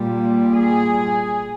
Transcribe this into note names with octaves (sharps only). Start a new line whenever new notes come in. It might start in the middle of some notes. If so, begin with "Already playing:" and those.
Already playing: A#2 G3
G#4